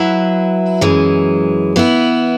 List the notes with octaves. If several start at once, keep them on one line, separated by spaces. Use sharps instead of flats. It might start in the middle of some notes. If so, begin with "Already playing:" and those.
Already playing: F#3 E4 B4 E5
F#2 E3 G#3
E3 B3 E4